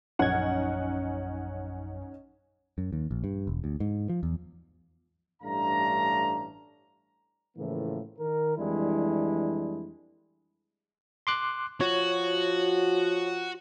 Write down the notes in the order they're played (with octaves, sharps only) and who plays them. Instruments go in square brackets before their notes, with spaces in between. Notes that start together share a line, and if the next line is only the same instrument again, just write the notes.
[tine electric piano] A#1 F#2 G#6 [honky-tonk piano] C#4 D#4 F#5
[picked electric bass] F#2
D#2
A#1
G2
E1
D2
G#2
F3
E2
[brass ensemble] A1 G2 A3 D4 F5 A#5
[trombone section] A2 C#3 E3 F3 A3 A#3
D#3 A#4
F2 E3 G3 G#3 D4 E4
[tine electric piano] C6 D6 F#6
[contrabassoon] F3 [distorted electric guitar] F#4 [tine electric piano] C#5